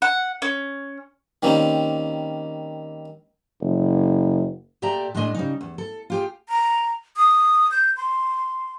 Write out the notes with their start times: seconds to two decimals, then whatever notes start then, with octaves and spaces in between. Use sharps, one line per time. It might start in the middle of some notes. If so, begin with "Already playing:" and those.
0.02 F#5
0.42 C#4
1.43 D#3 G3 A#3 C4 C#4
3.62 F#1
4.82 A#2 G4 A4 D5 E5 A#5
5.15 A2 G#3 A3 D4 D#5 G#5
5.35 C#3 G3 D#4
5.61 E2
5.78 A4
6.10 F4 G4 G#4
6.49 A#5
7.16 D#6
7.71 G6
7.97 C6